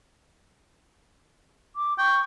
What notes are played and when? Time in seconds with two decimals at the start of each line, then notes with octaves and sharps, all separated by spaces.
1.76 D6
1.98 G5 C#6